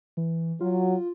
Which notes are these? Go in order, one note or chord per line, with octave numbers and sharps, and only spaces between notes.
E3
F#3 F4